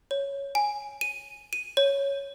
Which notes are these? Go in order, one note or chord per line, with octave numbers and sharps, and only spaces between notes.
C#5
G#5
D#7
D#7
C#5